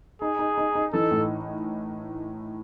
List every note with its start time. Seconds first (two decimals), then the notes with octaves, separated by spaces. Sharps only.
0.21 D#4 G#4
0.39 D#4
0.58 D#4
0.75 D#4
0.93 E3 A4
1.11 A2